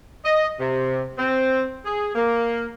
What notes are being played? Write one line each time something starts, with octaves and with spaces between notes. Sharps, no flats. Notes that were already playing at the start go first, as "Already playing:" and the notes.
D#5
C3
C4
G#4
A#3